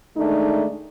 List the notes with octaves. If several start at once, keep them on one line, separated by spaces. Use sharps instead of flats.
D#3 G#3 A3 D4 D#4